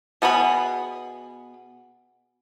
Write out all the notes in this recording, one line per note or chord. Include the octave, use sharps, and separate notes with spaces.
B2 B3 G#4 B5